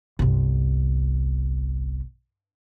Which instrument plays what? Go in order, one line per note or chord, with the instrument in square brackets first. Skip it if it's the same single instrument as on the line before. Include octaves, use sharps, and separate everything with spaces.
[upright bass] G1 C2